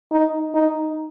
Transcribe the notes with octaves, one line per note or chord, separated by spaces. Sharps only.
D#4
D#4